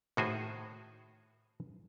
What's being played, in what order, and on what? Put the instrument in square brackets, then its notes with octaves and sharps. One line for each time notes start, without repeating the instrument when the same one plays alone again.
[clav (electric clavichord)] A2 D#3 F#4 G#4 C5 G#5